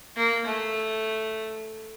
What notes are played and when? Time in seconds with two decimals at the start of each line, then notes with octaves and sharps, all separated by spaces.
0.16 A#3
0.45 A3